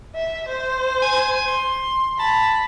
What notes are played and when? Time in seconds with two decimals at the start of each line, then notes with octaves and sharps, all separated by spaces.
0.15 E5
0.48 C5
1.02 G#5
1.48 C6
2.19 A5 B5